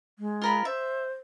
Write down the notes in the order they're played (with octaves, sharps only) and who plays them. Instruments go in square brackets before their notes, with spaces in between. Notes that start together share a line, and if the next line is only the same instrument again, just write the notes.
[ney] G#3
[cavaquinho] F4 A#4 B5
[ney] C5 [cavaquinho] E5